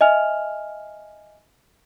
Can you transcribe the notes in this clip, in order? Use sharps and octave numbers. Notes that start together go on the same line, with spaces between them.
D#5 E5 G#5 F6 F7